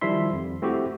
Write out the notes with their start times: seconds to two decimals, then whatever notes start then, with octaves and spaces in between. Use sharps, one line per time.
0.01 D#3 F3 G3 E4 E5 C6
0.33 F2
0.62 A3 C4 E4 F#4 G4